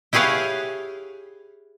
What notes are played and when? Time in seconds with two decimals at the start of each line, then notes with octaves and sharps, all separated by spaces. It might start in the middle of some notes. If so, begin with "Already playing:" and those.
0.13 E4 G4 G#4 C#5 F5 F#5